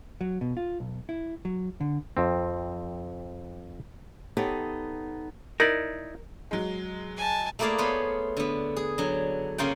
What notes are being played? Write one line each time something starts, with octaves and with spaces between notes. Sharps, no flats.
F#3
B2
F4
B1
E4
F#3
D3
F2 C4
B3 D#4 G4 A4 C#5
D#4 E4 A#4 D5
F#3 G#3
G#5 A5
A3 A#3 E4 G#4 D5 F5
B3 F4 C5 C#5 F#5
D3 B3
G#4
D3 F#3
C#3 A#3 C#4 F4 F#5 G5